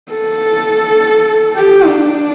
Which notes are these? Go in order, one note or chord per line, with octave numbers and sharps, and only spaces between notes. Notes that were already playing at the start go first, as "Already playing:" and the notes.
A4
G4
D4